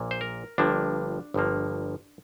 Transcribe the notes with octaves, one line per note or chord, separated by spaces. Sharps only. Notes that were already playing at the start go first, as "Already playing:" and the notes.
Already playing: A#1 A#2 A#3
C5
A#4
G1 G2 F3 A#3 D4
G1 G2 F3 A#3